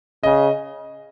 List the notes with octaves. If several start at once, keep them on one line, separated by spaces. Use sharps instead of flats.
C#3 D#5